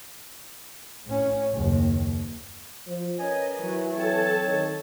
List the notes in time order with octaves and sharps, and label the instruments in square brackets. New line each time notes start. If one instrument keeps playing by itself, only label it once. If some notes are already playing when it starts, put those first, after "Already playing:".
[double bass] A2 C#4
F#1 D#2
[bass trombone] F3
[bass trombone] C#4 [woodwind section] A#4 B4 G#5 [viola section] D#5
[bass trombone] E3 [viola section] F#3
[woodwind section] F#3 C4 C#5 [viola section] A4 A5
[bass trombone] D#3